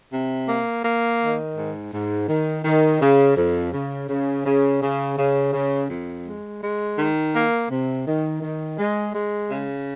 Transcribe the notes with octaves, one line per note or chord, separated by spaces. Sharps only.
C3
A#3
A#3
D#3
G#2
G#2
D#3
D#3
C#3
F2
C#3
C#3
C#3
C#3
C#3
C#3
F2
G#3
G#3
D#3
A#3
C3
D#3
D#3
G#3
G#3
C#3